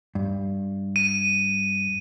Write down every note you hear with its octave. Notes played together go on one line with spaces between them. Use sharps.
G2
D#7